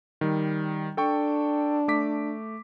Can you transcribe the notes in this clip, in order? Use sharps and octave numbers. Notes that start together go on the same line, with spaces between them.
D#3 G3
D4 A4 G5 C#6
A3 D6 B6